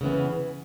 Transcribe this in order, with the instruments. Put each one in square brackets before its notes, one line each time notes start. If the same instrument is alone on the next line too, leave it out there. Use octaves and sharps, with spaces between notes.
[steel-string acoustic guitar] C#3 E3 B3